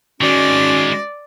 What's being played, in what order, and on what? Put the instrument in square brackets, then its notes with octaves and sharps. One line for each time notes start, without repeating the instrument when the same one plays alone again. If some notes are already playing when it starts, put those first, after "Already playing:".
[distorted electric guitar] D#3 G#3 [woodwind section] C#4 F#4 [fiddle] D5